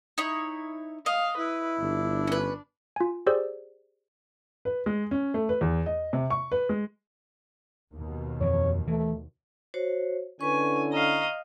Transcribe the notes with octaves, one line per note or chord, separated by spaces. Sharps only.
D#4 E4 C#5
D#5 F5
E4 B4
G1 D4
C#4 B4
F4 G#5
G4 G#4 C5 D5 E6
B4
G#3
C#4
A3
B4
E2
D#5
C3
C#6
B4
G#3
D#2 B2 D#3
F2 E3 C4 C#5
E3 A3
F#4 C5 C#5
D3 C#4 E4 B4 G#5 C#6
D#5 F5 A#5 C#6